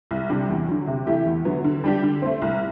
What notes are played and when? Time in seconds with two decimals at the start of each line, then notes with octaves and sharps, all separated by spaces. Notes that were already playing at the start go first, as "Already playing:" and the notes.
0.11 C2
0.30 C3 G3 D4
0.49 E2
0.69 D3 F#3
0.87 C3
1.07 E3 A3 E4 G4
1.26 E2
1.45 D3 F#3 B3
1.64 D3
1.84 G3 D4 G4
2.03 D3
2.22 A3 C4
2.42 C2